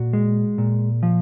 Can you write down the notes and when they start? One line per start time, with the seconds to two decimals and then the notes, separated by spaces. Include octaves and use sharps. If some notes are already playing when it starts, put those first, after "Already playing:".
Already playing: A#2 F#4
0.13 G#3
0.58 A#2
1.03 F3